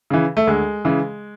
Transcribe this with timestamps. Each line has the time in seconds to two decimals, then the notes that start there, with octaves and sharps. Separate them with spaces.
0.10 C#3 E3
0.37 A3
0.47 D2 G#3
0.85 C#3 E3